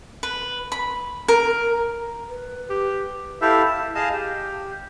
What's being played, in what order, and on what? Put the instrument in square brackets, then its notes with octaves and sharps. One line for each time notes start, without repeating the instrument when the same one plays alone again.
[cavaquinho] B4
B5
A#4
[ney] B4
[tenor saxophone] G4
[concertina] E4 G4 A4 E5 F5
A5
G#4 D#5 F5 A5
G4